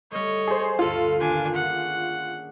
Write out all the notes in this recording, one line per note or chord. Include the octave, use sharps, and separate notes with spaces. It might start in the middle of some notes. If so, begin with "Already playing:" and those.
G3 A3 C#5 D#5
G#4 C5
G1 D2 F4 A4
D#1 A#3 D4 G#5
C#4 D4 G#4 F#5